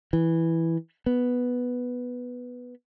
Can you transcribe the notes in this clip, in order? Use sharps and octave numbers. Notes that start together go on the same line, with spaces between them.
E3
B3